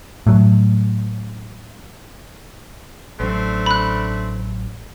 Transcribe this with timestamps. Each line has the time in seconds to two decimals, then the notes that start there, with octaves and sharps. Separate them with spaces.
0.27 A2 F#3
3.20 A1 F#3 A3 C4 D4
3.66 B5 F#6